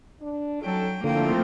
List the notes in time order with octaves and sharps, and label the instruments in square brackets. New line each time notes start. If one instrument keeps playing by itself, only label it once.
[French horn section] D4
[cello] F#3 G5 [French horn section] C#4 D#4 A4
[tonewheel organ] D3 [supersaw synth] F3 A3 C4 [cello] A#3 G5 [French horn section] E4 F4